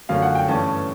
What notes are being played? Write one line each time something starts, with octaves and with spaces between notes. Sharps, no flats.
F#2 D3 F3 A3 C#4 F5
F#5
G5
G2 E3 A3 C#4 A5